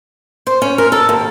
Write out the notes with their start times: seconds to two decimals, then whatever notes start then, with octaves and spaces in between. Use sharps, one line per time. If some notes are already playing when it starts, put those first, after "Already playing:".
0.47 C5
0.62 C#4
0.78 A#4
0.92 A4
1.09 D#2